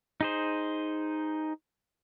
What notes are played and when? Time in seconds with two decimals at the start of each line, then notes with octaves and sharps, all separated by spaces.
0.21 D#4 G#4 C5